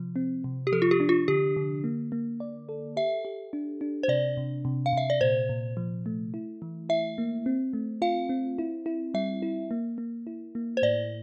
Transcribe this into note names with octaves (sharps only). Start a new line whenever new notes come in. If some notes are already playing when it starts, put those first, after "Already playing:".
Already playing: C3 F3
C4
C3
G4
F3 A4
F4
G4
D4
F4
D3 G4
D3
A#3
A#3
D5
A4
G4 E5
G4
D4
D4
C5
C3 D5
C3
C3
F5
C3 E5
D5
A#2 C5
A#2
F3
A3
E4
E3
E4 E5
A#3
C4
A3
F4 F5
C4
E4
E4
G3 E5
E4
A#3
A#3
E4
A#3
C5
A2 D5